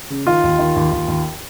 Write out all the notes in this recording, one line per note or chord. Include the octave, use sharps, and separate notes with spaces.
C#3
D#3 F4
D#2
D#3
D#2
D#2
D#2